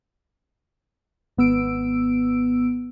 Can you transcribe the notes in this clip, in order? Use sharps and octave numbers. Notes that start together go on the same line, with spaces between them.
G#1 B3 E6 D7